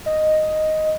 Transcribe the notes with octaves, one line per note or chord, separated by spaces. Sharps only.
D#5